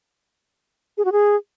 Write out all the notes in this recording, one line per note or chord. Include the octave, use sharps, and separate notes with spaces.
G#4
F#4
G#4